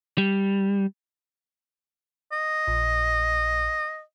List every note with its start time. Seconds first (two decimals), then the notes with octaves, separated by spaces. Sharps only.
0.18 G3
2.32 D#5
2.67 A#1